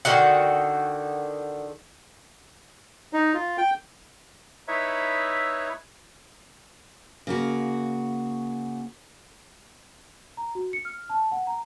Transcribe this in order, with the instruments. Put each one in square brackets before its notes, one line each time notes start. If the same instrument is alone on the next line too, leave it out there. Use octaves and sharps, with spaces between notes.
[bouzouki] D3 D#3 F#4 F#5
[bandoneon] D#4
F4
G5
[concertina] D#4 E4 B4 C#5 E5
[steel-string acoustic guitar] C#3 A#3 F#4
[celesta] A#5
F#4
C#7
F6
A5
F#5
A#5